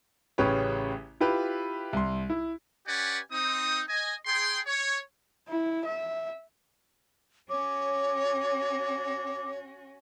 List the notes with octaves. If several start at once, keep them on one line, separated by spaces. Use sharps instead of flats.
A1 C#3 G4 B4 C#5
E4 F4 G4 B4
C2 C6
E4
C#4 G4 B4 D5 F#5 G#5
C4 D#4 D#6
D#5 G#5
G#4 G5 C6
C#5
E4
E5
C#4 F#4 C#5 D6